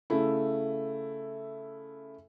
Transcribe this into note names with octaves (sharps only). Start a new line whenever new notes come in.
C#3 A3 E4